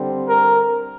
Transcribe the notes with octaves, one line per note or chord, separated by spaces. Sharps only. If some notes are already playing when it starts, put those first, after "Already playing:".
Already playing: D3 G3 C4
A#4